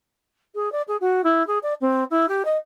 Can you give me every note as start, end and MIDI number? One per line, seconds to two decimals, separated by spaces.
0.55 0.71 68
0.72 0.82 74
0.87 0.97 68
1.00 1.21 66
1.24 1.45 64
1.47 1.58 68
1.63 1.74 74
1.81 2.04 60
2.10 2.26 64
2.28 2.42 67
2.45 2.57 75